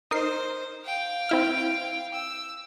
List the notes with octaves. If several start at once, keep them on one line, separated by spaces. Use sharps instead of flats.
D#4 A#4 C5 C7
F5 G5
C4 E4 F6
E6